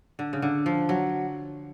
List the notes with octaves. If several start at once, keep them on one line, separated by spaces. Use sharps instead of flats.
D3
C#3
D3
F3
F#3